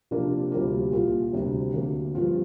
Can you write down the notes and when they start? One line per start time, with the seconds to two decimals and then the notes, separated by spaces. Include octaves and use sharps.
0.11 C3 F3 A#3 D4 F4
0.52 D2 C3 G3 A#3 F4
0.92 C2 A#2 A#3 F4
1.33 D2 C3 G3 D4
1.73 D2 D3 A#3
2.15 G2 F3 C4 F4